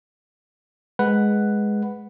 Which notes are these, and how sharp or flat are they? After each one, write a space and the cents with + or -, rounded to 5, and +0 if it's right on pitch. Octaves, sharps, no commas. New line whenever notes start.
G#3 +0 B4 +0 F#5 +0